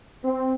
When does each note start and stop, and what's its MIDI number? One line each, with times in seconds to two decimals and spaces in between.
0.24 0.54 60